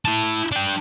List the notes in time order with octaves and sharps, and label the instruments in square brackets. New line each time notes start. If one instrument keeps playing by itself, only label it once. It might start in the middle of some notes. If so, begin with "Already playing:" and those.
[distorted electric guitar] E4 A5
D4 G5